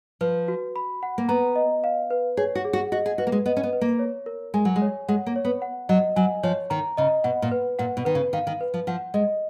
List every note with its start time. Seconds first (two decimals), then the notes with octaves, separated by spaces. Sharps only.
0.21 F3 B4
0.48 F#4
0.76 B5
1.03 F#5
1.18 A#3
1.29 B3 A#5
1.56 D#5
1.84 F5
2.10 B4
2.37 G#4 C#5
2.55 F#4
2.65 G#4
2.73 F#4
2.92 F#4 D#5
3.06 G#4
3.18 F#4 B4
3.27 A#3
3.32 G#3
3.46 B3 D#5
3.57 C#4
3.63 B3
3.73 B4
3.81 A#3
3.99 C#5
4.26 A#4
4.54 G#3 G#5
4.65 F#3
4.76 G#3
4.82 C#5
5.08 G#3 F#5
5.26 A#3
5.36 C#5
5.45 B3
5.62 F#5
5.89 F#3 D#5
6.16 F#3 G#5
6.43 F3 C#5
6.70 D#3 A#5
6.97 C#3 D#5
7.24 B2 F#5
7.42 A#2
7.51 B4
7.79 A#2 F#5
7.97 B2
8.05 D#3 B4
8.15 C#3
8.33 D#3 F5
8.47 D#3
8.61 B4
8.74 F3
8.87 F3 F#5
9.14 G#3 D#5